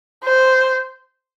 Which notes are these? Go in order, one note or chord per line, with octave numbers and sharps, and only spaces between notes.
C5